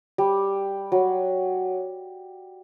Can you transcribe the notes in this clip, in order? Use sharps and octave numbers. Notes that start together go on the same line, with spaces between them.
G3
F#3